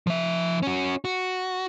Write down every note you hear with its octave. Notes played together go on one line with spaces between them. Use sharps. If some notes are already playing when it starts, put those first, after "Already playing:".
F3 E5
C#4 F#4
F#4